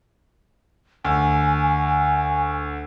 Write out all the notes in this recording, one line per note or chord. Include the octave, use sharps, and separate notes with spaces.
D2 G#5